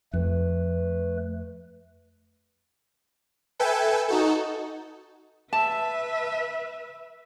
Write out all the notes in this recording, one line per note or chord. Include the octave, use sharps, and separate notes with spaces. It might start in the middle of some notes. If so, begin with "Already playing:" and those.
F2 A3 B4
A4 B4 E5 G5 G#5
D#4 F#4 A4
B4 E5 A5